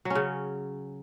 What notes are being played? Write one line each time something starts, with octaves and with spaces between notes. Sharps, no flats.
F#3
C#4
C#3